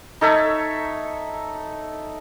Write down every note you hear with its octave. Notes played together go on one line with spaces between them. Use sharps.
D#4 A4 C#5 E5